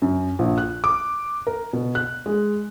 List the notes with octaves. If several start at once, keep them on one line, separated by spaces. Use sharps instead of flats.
F#2
A#1
F#6
D6
A#4
B2
F#6
G#3